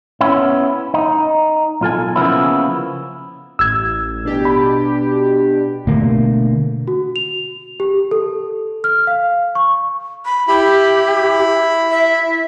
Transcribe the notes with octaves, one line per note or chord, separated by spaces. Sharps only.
B3 C#4 E4
D#4
B1 F4 A4 G#5
C#3 F3 A#3 B3 E4
A1 E6 G#6
B2 D4 G4
B5
B2 D3 A3 A#3
F#4
F7
G4
A4
F6
F5
C#6
B5
E4 G4 B5
E5